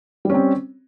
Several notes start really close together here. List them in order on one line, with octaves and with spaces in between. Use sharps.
G3 C#4 C4